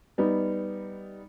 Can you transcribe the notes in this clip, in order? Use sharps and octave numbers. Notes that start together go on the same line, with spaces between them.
G3 B3 D#4